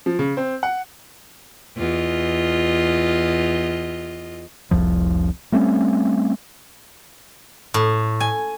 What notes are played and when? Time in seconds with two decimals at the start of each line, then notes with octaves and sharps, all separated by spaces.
0.06 F3
0.19 C#3
0.37 C4
0.63 F#5
1.77 E2 F4 D#5
4.71 F1 C2 F2 F3
5.52 G3 A3 C4 C#4
7.74 A2
8.20 G#5